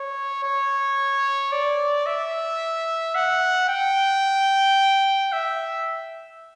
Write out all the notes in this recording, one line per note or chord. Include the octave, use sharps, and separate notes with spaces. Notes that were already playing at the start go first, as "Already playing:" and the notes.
Already playing: C#5
C#5
D5
E5
F#5
G5
E5